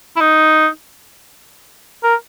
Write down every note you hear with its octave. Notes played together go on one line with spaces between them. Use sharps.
E4
D#4
A#4